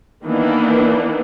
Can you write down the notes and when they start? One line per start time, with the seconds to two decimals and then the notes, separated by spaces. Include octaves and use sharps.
0.23 D#3 E3 A#3 B3 D4